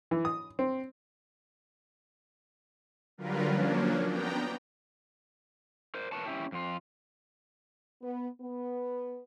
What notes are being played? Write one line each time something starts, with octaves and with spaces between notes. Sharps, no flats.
E3
D#6
C4
D3 F#3 G3 F4 A#4 B4
F3 F#3 A#3 C#4 D4
B3 D4 G5 A#5
A#4 C5
A#4 B4 C#5 A5
C#4 E4 G4
F2 F4
B3
B3